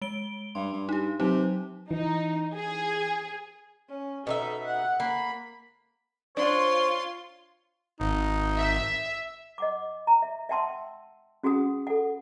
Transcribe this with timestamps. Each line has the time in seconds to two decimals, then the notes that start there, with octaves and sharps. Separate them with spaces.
0.02 G#3 D7 G7
0.55 G2 C6
0.73 G2
0.89 D#4 G4
1.20 C3 F#3 D#4
1.91 E3 D#4
2.54 G#4
3.89 C#4
4.27 B2 D#4 A4 E5
4.65 F#5
5.00 A#3 B5
6.37 D4 F4 C5 C#5 C6
8.00 G#1 D#4
8.58 E5
9.58 D#5 F#5 D6
10.07 A#5
10.22 E5
10.49 E5 F#5 G5 A5 C6 E6
11.43 C#4 F#4 G#4 F#5 D#6
11.87 A4 F#5